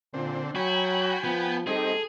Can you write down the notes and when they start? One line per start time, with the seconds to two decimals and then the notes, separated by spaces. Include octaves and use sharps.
0.14 A#2 D3 C4
0.55 F#3 F#4 G5 G#5 B5
1.24 F3 B3
1.67 G3 C4 D#4 G#4 A4